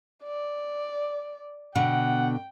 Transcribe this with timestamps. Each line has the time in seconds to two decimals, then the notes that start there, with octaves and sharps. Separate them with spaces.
0.23 D5
1.75 B2 D3 F#5 G5